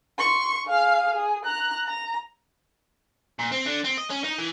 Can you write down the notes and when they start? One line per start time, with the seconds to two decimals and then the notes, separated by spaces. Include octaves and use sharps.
0.19 C6 C#6
0.67 G#4 F5
1.13 G#4
1.45 A#5 F#6
1.86 A#5
3.39 A#2
3.52 C4
3.66 D3
3.84 C4
3.97 D#5
4.10 C#4
4.24 D#4
4.39 E3